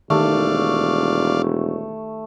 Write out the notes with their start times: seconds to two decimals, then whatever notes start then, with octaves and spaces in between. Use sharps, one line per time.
0.10 E1 D#3 A3 G4 D5 F5